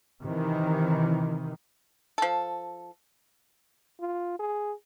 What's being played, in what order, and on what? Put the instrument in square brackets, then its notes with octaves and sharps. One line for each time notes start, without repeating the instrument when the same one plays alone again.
[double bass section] C3 D#3 E3
[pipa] F3 A4
[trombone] F4
G#4